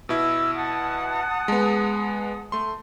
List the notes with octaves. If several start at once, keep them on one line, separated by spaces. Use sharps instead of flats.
B2 E4 E6
F#5 A5 D#6
G#3 B3
A3 C6